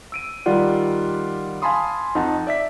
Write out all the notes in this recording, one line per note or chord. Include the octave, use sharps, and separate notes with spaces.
E6 D7 D#7
D#3 G3 F4 D5 F#5
F5 G#5 A5 B5 C6 D#6
F2 D#4 F#5 A5
D5 E5 B6